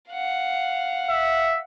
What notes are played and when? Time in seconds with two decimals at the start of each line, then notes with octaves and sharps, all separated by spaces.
0.10 F5 F#5
1.10 E5